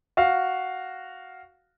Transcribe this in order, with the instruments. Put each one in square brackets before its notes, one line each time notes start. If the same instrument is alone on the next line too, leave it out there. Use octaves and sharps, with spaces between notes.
[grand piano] F#4 F5